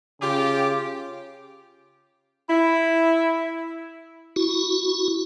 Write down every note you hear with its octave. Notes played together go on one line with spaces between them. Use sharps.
C#3 F4 G4
E4
E4 F#4